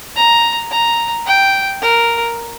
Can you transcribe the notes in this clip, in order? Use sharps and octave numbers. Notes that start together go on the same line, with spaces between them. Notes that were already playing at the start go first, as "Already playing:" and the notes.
A#5
A#5
G5
A#4